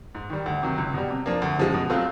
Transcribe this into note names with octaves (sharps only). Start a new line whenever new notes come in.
G#2
D#3 G3
D2
C3 D#3 F#3
C#2
B2 G3
C3
F3 A#3 D4
D2
C#3 F3 G#3
B2
F#3 A3 C4 F4